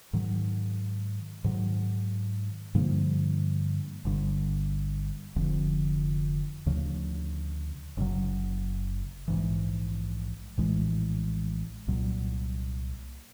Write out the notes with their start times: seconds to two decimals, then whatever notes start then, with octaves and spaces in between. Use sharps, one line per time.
0.13 G#2 D#3 F#3
1.44 G#2 D#3 F#3
2.75 G2 D3 F3 A#3
4.05 G1 G2 D3
5.36 F1 F2 D3 F3
6.66 D2 C#3 F3
7.97 F#1 E2 C#3 F#3
9.28 A#1 G#2 E3
10.58 A#1 A2 E3 G#3
11.88 C2 A#2 F#3